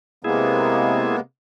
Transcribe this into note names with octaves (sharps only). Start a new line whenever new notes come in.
C3 G#3 A#3 B3 E4 G#4